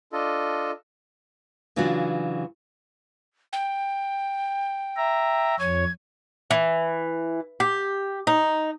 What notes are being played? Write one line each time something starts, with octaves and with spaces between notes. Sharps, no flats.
D4 F4 A4 D#5
C#3 E3 F#3 D4 F4 F#4
G5
E5 A#5
F2 C#5 G#6
E3
G4
D#4